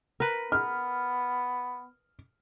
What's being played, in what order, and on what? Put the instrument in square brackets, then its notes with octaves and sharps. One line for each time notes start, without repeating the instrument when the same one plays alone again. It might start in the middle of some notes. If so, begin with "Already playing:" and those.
[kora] A#4 B4
[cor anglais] B3 [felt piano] F6